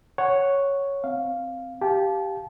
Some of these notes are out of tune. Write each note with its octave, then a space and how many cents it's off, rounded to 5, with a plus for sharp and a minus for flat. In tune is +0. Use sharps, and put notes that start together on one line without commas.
C#5 +0 F#5 +0
C4 -5 F5 +0
G4 +0 F5 +0 A5 -30